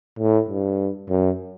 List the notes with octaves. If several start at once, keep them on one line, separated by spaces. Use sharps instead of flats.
A2
G2
F#2